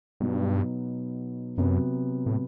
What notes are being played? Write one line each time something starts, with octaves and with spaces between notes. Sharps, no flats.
G2 B2 F#3 B3 D#4 F#4
F#2 C3 F#3 B3
A2